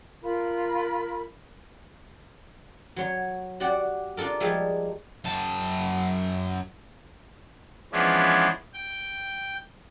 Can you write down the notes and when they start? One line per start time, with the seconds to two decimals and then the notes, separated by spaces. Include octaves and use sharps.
0.22 F4 A#4 B5
2.96 F#3 C#5
3.60 F#4 G4 D5 F#5
4.17 D4 F4 A4 A#4
4.40 F3 G3 G#3 E5
5.24 F#2 A5
7.92 E3 F3 G#3 B3 C#4 D4
8.74 G5